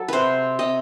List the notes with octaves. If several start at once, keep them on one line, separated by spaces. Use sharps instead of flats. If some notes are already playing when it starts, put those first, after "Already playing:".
Already playing: F#3 A4
C3 B4 C5
C3 D#5